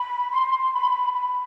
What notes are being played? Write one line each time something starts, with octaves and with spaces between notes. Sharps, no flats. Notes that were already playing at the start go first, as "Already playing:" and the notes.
Already playing: B5
C6
B5
B5